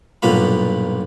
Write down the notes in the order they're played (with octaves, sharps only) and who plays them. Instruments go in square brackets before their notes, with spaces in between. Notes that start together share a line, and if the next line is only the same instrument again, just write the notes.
[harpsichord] B1 G2 A#2 B3 F4 B5